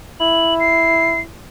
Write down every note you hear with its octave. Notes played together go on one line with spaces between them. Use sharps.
E4 F#7
C7